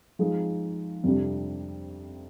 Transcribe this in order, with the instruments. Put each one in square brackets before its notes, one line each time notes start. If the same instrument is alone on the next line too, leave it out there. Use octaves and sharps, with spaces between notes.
[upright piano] F3 G#3 D#4 G#4
F2 C3 G3 D4